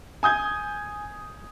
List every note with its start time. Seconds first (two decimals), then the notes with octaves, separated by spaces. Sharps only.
0.23 G#5 D#6 G6 G#6